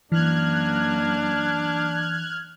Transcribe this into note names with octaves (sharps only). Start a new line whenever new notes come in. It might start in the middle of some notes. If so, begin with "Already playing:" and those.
F#2 E3 A#3 D4 F6 F#6 G#6